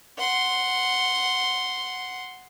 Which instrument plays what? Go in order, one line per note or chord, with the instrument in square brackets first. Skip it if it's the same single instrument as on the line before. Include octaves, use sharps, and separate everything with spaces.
[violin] F#5 C6